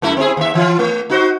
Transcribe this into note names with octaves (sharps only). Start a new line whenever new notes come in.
F#2 A3 E4
C4 E4 G#4
D#2 E5
E3 F4
A3
D#4 F#4 C5